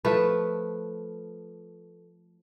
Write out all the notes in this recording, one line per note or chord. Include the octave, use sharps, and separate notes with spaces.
F3 A3 B4